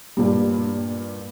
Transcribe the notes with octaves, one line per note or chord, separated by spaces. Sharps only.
G2 A#2 G3